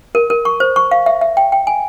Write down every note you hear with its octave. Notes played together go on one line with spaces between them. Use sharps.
A#4
A#4
C#6
C5
C#6
F5
E5
E5
G5
G5
G#5